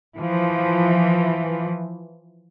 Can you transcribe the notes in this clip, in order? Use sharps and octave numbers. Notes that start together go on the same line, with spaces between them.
E3 F3